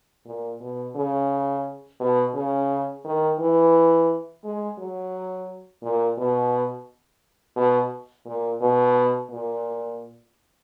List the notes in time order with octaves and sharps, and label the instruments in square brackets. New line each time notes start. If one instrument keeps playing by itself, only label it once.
[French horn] A#2
B2
C#3
B2
C#3
D#3
E3
G#3
F#3
A#2
B2
B2
A#2
B2
A#2